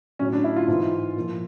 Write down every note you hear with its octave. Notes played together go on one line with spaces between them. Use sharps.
A2 F#3 C#4
D4
E4
F4
G#2 E3
A#2 F3